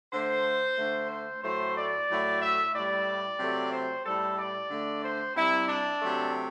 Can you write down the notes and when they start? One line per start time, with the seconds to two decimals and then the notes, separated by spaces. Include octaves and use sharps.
0.13 D3 A3 C5
0.78 D3 A3
1.11 C5
1.44 A2 F#3 A3 C5
1.77 D5
2.09 A2 F#3 A3
2.42 E5
2.75 A2 G3 D5
3.40 C3 F#3 A3
3.73 C5
4.06 A2 G3 A4
4.38 D5
4.71 D3 A3
5.03 C5
5.35 C3 G3 E4
5.68 D4
6.02 C3 F#3 A3